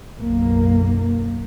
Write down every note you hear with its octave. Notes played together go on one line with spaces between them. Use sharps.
F#1 B1 A#3